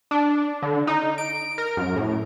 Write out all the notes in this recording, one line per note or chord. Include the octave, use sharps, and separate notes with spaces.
D4
D3
D#4
D7
A#4
F#2
A2